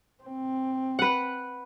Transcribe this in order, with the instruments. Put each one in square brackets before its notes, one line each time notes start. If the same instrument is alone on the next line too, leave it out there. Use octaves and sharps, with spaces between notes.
[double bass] C4
[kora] B4 F#5